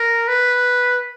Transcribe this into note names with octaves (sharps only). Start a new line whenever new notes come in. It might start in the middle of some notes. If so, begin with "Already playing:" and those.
Already playing: A#4
B4